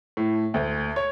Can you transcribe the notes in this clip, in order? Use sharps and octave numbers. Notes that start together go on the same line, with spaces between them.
A2
D2
C#5